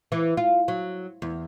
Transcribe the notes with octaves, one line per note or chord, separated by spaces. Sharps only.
E3
F4
F#3
E2